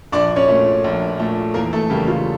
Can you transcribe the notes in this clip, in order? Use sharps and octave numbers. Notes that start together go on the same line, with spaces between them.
A#1 D4 D5
C#4 C#5
A#2 A3
A#1
A#2 A3
E2 A#3 A#4
A3 A4
C#3 E3 G3 A#3 G4
F4